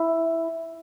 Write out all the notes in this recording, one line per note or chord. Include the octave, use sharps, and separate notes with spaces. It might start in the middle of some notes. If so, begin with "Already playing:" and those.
Already playing: E4